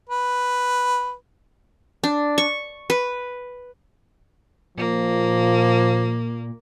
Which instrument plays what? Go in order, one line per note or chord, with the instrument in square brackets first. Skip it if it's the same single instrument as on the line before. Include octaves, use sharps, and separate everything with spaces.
[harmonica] B4
[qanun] D4
C#6
B4
[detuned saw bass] A#2 [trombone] F3 [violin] A#3